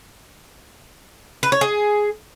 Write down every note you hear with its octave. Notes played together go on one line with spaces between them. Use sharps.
B4
C#5
G#4